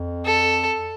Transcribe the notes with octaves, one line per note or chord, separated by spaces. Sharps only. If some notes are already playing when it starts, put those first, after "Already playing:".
Already playing: F2
A4